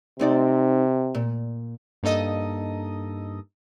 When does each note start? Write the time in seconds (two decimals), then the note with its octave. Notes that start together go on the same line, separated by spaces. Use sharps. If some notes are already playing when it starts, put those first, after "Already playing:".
0.20 C3 C4 D#4 D5
1.15 A#2
2.03 G2 A#3 D#4 A4 D#5 D#6